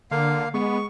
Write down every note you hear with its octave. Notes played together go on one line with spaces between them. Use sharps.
D3 A#3 F5
G#3 B3 C#6